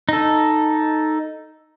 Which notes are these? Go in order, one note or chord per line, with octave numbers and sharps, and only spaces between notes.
D#4 A4